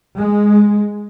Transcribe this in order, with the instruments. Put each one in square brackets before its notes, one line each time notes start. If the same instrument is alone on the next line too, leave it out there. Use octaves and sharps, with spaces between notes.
[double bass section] G#3